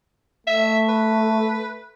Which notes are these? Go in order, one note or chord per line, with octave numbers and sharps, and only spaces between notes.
A3 E5
B4